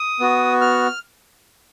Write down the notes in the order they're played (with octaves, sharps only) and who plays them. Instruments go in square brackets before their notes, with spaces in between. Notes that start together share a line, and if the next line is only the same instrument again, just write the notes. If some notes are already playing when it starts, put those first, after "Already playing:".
Already playing: [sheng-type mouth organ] D#6
B3 F#4
F6